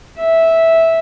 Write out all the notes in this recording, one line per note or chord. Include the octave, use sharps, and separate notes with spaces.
E5